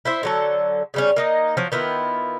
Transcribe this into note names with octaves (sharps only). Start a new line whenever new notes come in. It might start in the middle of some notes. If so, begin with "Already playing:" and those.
E4 C5 E5
D3 F#3 A4
C#3 G3 C#4
A#3 D#4 D#5
F3 F#3
D#3 B3 E4 F4